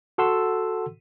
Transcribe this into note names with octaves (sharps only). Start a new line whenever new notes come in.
F#4 A4 F#5 C6 E6